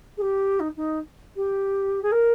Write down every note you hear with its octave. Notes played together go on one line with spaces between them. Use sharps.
G#4
G4
D#4
D#4
G4
G#4
A#4